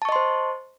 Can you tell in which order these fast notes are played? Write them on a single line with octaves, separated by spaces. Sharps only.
A5 C#6 D#5 C6 C5